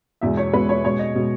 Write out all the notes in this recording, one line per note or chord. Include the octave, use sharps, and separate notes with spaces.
E2 B2 G#3 E5
C#5
E2 B2 G#3 B4
C#5
B2 G#3 C#5
D#5
B2 G#3